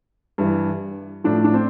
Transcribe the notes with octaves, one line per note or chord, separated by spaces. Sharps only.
G2 E3
A2 F3 D4
D4
C4